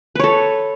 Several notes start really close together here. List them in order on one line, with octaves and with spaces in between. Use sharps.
B4 C#5 A4